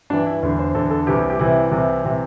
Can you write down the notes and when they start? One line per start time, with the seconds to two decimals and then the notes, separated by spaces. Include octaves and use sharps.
0.10 G2 E3 D4
0.26 E4
0.43 E2 D3
0.59 C5
0.75 E2 D3 A4
0.91 A4
1.07 C2 C3 E3 G4
1.30 G4
1.39 C2 C3 E3 E4
1.71 C2 C3 E3
2.04 C3 E3